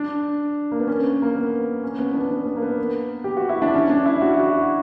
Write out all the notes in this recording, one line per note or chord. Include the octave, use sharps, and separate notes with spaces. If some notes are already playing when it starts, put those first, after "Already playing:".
Already playing: D4
A#3
B3
C#4
A#3
B3
C#4
B3
D4
B3
B3
A#3
B3
G4
F#4
E4
D4
C#4
D4
E4
F#4
E4
F#4